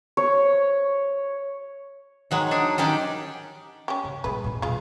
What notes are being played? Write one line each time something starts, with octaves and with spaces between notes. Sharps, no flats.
C#5
D#3 F#3 G#3
D4 D#4
D#3 C#4 G4 D5
C#4 G4
C#3
A#2 G3 G#3 B4
A#2 D4
E2 B2 G#3 F4